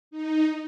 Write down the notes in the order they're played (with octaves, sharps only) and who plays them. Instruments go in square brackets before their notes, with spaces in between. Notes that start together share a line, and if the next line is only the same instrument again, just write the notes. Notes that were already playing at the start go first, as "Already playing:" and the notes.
[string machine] D#4